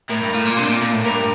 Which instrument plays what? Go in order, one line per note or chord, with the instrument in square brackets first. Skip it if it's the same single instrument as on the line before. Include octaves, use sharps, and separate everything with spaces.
[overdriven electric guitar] A2 [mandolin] A#4
[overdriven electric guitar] G2
[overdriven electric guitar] A2 [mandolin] F4
[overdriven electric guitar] A#2
[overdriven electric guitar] C3 [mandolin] D4
[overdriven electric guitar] A#2
[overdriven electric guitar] A#2 [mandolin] A#4
[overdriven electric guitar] A2
[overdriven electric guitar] G2 [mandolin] A#4